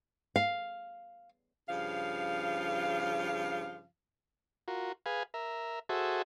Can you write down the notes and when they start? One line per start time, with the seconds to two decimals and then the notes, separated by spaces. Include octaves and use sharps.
0.36 F5
1.68 G2 C#3 F3 F5
4.68 F4 F#4 A#4
5.06 G#4 B4 F5 G#5
5.34 A#4 E5
5.89 F#4 G#4 A4 C5 E5